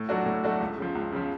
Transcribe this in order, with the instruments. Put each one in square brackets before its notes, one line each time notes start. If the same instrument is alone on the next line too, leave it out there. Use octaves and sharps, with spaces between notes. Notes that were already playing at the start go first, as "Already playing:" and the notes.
Already playing: [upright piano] A2
F#3 A3 D4 F#4
A2
F#3 A3 D4 F#4
C#2
C#3 F3
C#2
C#3 F3